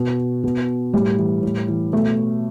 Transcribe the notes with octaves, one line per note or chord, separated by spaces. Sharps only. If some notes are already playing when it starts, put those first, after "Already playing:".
Already playing: B2
B2
A2 G3
E3
A2
E3
B2 A3